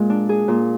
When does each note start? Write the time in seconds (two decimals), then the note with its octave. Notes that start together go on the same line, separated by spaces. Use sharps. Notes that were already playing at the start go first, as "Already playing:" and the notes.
Already playing: A#2 G#3 G#4
0.10 D4
0.29 G#4
0.48 A#2